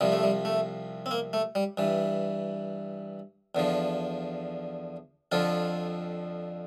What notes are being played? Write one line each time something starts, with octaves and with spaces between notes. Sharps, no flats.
C2 C3 F3 G3
A3
G3
A3
C4
A#3
A3
G3
G2 E3
E2 D3 F3
F2 D3 F3 F4